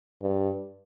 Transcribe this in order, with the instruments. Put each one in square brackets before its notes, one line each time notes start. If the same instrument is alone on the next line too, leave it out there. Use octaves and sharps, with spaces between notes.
[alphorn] G2